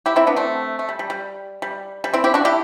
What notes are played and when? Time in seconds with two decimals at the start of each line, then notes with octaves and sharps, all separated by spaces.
0.06 E4 G4
0.16 C4 E4
0.27 B3 D4
0.36 A3 C4
0.79 A3
0.89 G3
0.99 G3
1.10 G3
1.62 G3
2.04 G3
2.14 C4 E4
2.24 E4 G4
2.34 D4 F#4
2.45 E4 G4